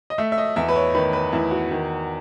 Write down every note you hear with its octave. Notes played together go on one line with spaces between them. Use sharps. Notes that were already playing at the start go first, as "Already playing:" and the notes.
D#5
A3 E5
E5
D#5
E2 E5
B4
C#5
D#3 B4
B4
E2 E4
F#4
D#3